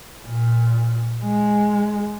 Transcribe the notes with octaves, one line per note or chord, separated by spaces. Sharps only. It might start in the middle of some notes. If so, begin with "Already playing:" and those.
A#2
G#3